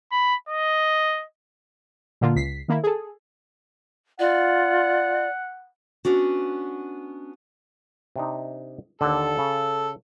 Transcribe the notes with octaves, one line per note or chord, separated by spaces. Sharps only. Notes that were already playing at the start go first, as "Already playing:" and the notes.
B5
D#5
A#2 D3 A#3 F4
C#2 B6 C7
D#3 A#3 E4
G#4 A4
F4 D5 F#5
B3 C#4 D4 F#4
C3 D4 D#4
D#2 D3 A4
C#3